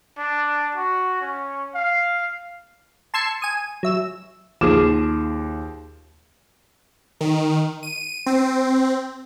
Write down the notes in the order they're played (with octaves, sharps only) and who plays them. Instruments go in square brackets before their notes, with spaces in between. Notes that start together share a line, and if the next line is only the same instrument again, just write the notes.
[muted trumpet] D4
F#4
C#4
F5
[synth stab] A5 C6 E6 G#6 C7 C#7
G#5 D#6
F#3 E5 E7
[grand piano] D#2 D6 E7 [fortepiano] F3 G#4
[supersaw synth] D#3
D#7
C4